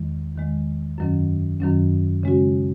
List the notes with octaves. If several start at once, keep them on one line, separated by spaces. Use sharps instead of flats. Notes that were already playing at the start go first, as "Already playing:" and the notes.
Already playing: E2 D#3 G#3
E2 D#3 G#3
F#2 D#3 F#3 C#4
F#2 D#3 F#3 C#4
C#3 G#3 C#4 F#4